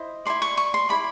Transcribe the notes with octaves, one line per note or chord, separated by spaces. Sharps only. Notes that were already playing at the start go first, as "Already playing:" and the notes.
Already playing: E4 C5 D#5
E4 A4 D5 C6
C#6
C#6
C6
E4 A4 D5 B5